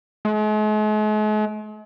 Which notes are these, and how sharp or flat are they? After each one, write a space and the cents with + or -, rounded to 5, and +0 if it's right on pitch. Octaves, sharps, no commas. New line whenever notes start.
G#3 +45